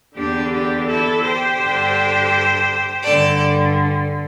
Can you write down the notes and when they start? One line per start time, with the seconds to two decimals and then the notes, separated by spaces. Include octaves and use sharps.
0.16 E2 D3 D4 G4
0.51 D4 G4
0.88 E4 A4
1.23 G4 C5
1.59 G2 D3
3.03 G2 D3 A4 D5